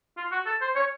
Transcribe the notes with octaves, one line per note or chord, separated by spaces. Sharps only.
F4
F#4
A4
C5
C#5